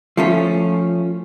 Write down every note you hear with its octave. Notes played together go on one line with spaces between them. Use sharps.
F3 A3 C#4